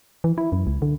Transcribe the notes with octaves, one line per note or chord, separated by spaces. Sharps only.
E3
E4
F#2
C#2
D3